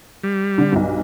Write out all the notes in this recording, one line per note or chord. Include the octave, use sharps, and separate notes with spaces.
G3
D3 D4
B1 G2